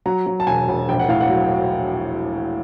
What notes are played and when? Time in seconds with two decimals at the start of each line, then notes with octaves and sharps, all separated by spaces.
0.06 F#3 A#5
0.26 F#3
0.40 A5
0.47 E1 G#5
0.68 E1
0.89 A#1 G5
0.99 F#5
1.09 A2 F5
1.20 F#5
1.30 F#3